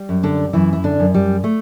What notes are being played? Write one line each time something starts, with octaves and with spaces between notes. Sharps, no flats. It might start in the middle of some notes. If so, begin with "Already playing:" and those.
Already playing: G3
F#2
D3 D4
F#2 E3 E4
E4
D3 D4
F#2
G3
A3